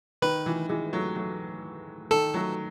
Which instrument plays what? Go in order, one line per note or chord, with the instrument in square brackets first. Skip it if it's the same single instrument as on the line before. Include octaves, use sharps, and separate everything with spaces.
[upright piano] D#3 [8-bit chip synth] B4
[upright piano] E3
E3 G#3
F#3 A3
F#3 A3
[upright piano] D#3 [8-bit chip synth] A4
[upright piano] F#3 A3